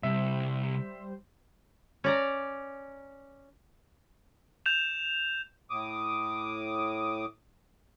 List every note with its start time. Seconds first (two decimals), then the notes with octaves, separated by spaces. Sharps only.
0.03 C2 C3 G3 C5 E5
2.04 C#4 D5 A#5
4.66 G6 E7 F7
5.70 A2 D6 D#6